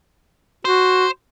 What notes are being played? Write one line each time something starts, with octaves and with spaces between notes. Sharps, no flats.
F#4 C5